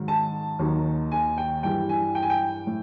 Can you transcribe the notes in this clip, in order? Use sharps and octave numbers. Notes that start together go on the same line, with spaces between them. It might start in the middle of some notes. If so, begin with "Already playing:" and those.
Already playing: G#2 D#3 F#3
A5
D#2 D#3 F#3
G#5
G5
G2 E3 G3 G5
G#5
G5
G#5
G5
A2